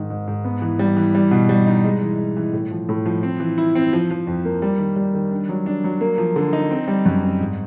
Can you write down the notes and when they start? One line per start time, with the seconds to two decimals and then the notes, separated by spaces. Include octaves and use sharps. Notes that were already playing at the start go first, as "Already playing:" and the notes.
Already playing: G#2 D#3
0.10 G#2
0.28 G#2
0.45 B3
0.62 E3
0.79 G3
0.96 E3
1.15 G3
1.31 B2
1.49 G3
1.66 D#4
1.84 G#3
2.01 E3
2.18 G#3
2.37 E3
2.53 A2
2.71 F3
2.89 A2
3.06 F3
3.23 C4
3.40 E3
3.58 E4
3.75 C4
3.93 F3
4.10 F3
4.27 F2
4.45 A#3
4.62 G3
4.79 D#3
4.96 G3
5.14 D#3
5.31 D4
5.49 F#3
5.66 D4
5.84 F#3
6.01 A#3
6.18 F3
6.36 D3
6.53 D#4
6.71 C4
6.88 G3
7.06 F#2
7.23 C4
7.40 G#2